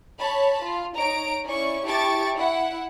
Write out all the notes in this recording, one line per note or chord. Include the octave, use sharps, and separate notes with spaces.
C#5 A5 B5
F4
D#4 C#5 A#5 D7
C#4 E4 D5 C#6
E4 G4 A5 C#6 A6 D7
E4 F#5